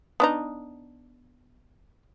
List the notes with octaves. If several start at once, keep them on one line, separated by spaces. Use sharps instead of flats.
B3 D4 D#4